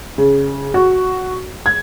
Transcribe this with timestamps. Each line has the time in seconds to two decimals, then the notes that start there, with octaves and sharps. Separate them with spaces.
0.18 C#3
0.74 F#4
1.66 G#6